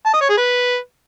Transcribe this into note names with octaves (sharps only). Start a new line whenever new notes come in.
A5
D#5
C#5
G#4
B4